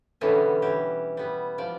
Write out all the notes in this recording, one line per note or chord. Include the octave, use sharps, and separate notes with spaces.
B2 D3 E3 G3 B3 C#4
E3 G4
G3 B3
F3 D5